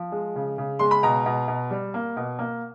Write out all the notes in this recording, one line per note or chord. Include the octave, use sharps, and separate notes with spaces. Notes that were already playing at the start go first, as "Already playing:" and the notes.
Already playing: F3
G#3
C#3
C#3
G#3 C6
B5
B2 A#5
B2
B2
G3
A#3
B2
A#3